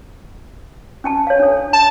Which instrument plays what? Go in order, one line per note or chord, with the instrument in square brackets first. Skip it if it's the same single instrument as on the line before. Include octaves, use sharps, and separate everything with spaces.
[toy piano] C#4 G#5 A5
C#5 F5
D4 A4
[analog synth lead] A5